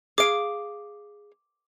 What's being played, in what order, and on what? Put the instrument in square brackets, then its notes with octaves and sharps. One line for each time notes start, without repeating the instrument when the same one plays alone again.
[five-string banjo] G#4 F5 [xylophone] D6 D7